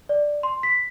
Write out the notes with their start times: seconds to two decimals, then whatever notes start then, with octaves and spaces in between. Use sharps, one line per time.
0.09 D5
0.43 C6
0.63 B6